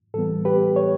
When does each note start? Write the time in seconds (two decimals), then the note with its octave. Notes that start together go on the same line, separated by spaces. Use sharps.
0.14 A2 E3 G3 B3 A4
0.45 G4 B4
0.76 C#5